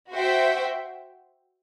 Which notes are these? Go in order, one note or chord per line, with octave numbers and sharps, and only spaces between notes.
F#4 C5 E5 G5